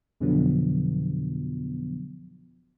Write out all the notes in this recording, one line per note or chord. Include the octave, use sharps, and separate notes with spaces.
F2 B2 D3 F3 F#3 B3